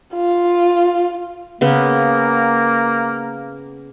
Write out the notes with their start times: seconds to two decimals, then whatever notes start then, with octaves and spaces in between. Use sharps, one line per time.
0.14 F4
1.61 C#3 A#3 B3